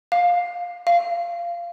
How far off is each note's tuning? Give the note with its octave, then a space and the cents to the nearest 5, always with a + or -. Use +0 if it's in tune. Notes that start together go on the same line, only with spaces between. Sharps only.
F5 +15
F5 -20